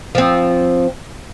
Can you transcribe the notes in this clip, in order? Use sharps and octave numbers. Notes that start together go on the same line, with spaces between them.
F3 C4